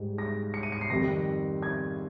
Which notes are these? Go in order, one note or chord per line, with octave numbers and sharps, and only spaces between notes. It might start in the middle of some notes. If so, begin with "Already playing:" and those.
Already playing: G#2 G3
A#6
C#7
D#7
C#7
C7
F2 D#3 G3 A#6
G#6